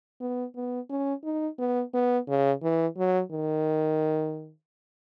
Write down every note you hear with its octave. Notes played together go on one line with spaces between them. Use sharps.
B3
B3
C#4
D#4
B3
B3
C#3
E3
F#3
D#3